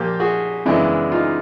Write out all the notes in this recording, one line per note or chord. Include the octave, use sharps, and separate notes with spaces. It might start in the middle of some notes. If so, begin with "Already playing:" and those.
Already playing: A#2 F3 A#3 F4 G4
F#4 G#4
F#2 C#3 E3 G#3 B3 D4 E4
D#4 F4